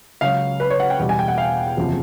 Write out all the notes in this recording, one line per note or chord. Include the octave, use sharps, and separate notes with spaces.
C#2 C#3 F#3 F5
B4
C#5
F#5
G5
E2 B2 G3
G#5
G5
F#5
F5
F#1 E2 C3 F3